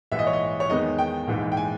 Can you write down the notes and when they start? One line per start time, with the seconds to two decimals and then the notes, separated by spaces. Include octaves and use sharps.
0.12 A#1 G#2 E3 E5
0.19 D#5
0.27 C#5
0.33 D#5
0.60 C#5
0.70 E2 D#3 G#3 B3 D#4 D#5
0.99 G5
1.28 A#1 G#2 E3 G#3 D#4
1.52 G5
1.57 G#5